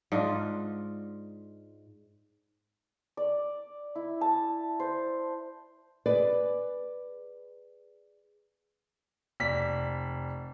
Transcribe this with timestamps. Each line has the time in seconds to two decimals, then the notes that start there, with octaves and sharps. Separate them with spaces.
0.12 G#2 D4 F4 D#5
3.17 D5
3.95 E4
4.21 A5
4.80 C5
6.06 G#4 B4 D5
9.40 F1 D5 B6